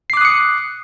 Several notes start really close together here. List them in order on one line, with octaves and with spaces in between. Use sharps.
C7 D6 F#6 D#6 C#7